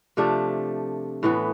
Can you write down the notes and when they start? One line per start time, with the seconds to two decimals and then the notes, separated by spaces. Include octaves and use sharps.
0.17 C3 F3 A3 D4
1.23 A2 E3 B3